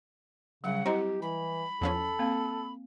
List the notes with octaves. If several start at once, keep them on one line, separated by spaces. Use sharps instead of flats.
C#3 F#3 G3 F#5
C4 E4 G4 D#5 A#5
E3 B5
E2 F3 C#4 A4
A#3 C4 F5